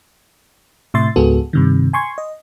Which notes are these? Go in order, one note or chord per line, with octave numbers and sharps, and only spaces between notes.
A2 C3 E5 C6 A6
C#2 G#2 B3 F#4 G#4 A4
G2 C3 D#3
G#5 C6 C#6 G#6
D#5